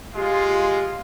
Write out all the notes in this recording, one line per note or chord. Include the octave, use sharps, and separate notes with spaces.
G#3 F4 G4